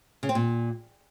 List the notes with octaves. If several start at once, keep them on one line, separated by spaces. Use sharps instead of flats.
C#3
C4
A#2